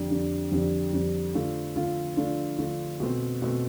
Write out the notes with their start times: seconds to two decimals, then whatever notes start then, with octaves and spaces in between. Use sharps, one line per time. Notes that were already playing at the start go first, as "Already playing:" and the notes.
Already playing: F2 D3 G3 D4
0.10 F2 D3 G3 D4
0.51 F2 D3 G3 D4
0.93 F2 D3 G3 D4
1.34 D3 A3 D4 F4
1.76 D3 A3 D4 F4
2.17 D3 A3 D4 F4
2.58 D3 A3 D4 F4
3.00 B2 A3 C4
3.42 B2 A3 C4